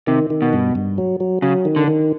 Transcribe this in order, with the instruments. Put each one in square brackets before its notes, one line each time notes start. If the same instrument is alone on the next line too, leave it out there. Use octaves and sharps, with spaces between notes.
[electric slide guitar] C3 [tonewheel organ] D#3
[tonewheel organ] D#3
[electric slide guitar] B2
[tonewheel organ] G2
G2
F#3
F#3
[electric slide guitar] C#3 [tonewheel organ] F#3
[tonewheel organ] D#3
[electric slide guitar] D3
[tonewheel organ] D#3